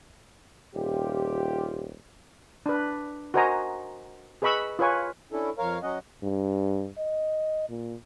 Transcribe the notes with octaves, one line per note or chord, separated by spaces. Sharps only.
D#1 F4 G4
D4 B4
F#4 A#4 C5 D#5 G#5 A#5
G#4 B4 D#5 B5 C#6 E6
F4 B4 C#5 G#5 C#6
C#4 D4 E4 A4
F2 A#4 C#5 F5
F#3 C#4 D#5 F#5
G2
D#5
A#2